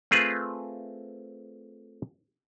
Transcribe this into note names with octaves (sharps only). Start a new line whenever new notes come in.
A3 C4 F4 G#4 B4